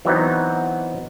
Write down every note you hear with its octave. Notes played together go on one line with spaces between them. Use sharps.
E3 F#3 B3 C4 D#4